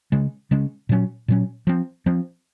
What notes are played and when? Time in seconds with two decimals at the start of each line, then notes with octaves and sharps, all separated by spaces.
0.12 C#3 G#3 C#4
0.51 C#3 G#3 C#4
0.89 A#2 F#3 C#4
1.28 A#2 F#3 C#4
1.67 F3 C4
2.06 F3 C4